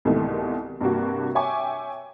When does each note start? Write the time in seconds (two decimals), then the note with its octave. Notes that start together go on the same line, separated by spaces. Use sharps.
0.05 C2 G#2 B2 D#3 E3 A3
0.81 G2 C3 A#3 F#4
1.35 C#5 E5 G5 G#5 C#6 D6